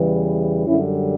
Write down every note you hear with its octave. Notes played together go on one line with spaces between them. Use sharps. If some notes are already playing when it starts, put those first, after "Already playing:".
Already playing: E2 C#3 E3 G3
F#2 D3 G3 C#4 E4